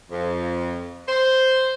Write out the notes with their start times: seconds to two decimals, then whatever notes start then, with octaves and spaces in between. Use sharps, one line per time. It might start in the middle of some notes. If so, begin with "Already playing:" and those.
0.11 F2
1.07 C5